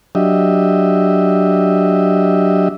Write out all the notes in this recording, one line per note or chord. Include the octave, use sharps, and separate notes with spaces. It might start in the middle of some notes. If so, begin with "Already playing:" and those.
F#3 D4 G4 D#5 E5